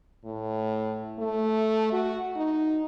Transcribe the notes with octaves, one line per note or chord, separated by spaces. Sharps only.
A2
A3
F#4
D#4